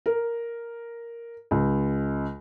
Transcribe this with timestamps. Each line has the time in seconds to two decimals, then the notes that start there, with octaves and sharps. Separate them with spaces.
0.06 A#4
1.51 C#2